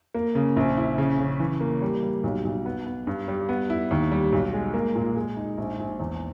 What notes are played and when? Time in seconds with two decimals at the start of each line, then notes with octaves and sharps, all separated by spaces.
0.15 A#3
0.35 C#3
0.57 A#1
0.77 E4
0.98 C#3
1.19 C#3
1.40 E3
1.61 A#3
1.82 G3
2.03 G3
2.24 B1
2.45 B1
2.65 B3
2.86 B3
3.07 G2
3.28 G3
3.49 B3
3.70 E4
3.91 D#2
4.12 G3
4.32 B1
4.53 G#3
4.74 A#3
4.95 A#2
5.16 G#3
5.37 D#4
5.58 A#1
5.79 A#1
6.00 E2